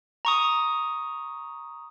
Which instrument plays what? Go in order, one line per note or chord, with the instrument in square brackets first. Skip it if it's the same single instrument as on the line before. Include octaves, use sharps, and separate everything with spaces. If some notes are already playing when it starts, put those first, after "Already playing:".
[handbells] A#5 C#6 D#6